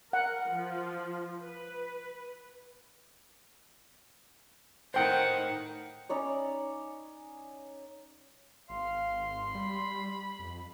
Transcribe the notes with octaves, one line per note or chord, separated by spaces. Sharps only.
A#4 F#5
F3
B4
A2 D#3 C5 F#5 G5
C#4 D#4 C#5 D5
G#1 F5 C6
G3 B5
F2